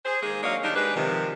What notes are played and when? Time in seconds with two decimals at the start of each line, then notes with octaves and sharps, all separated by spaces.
0.05 G#4 C5
0.23 D#3 G#3 A#3 G#4
0.43 F#3 A#3 D4 C#5 D#5 F5
0.63 D#3 G3 G#3 D4 D#4
0.76 G#3 D4 G4 B4
0.95 C3 D#3 F3